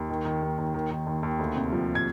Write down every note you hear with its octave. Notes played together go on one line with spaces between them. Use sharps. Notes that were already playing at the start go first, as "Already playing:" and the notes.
Already playing: D#2
D#3
D#3
D#2
D#2
D#3
D#3
D#2
D#2
D2
C3
F3
G#6